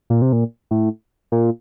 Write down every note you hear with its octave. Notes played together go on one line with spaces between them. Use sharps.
A#2
C3
A#2
A2
A#2